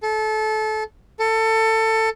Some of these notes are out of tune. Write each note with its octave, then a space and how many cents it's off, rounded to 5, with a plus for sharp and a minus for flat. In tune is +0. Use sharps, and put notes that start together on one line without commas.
A4 -25
A4 +20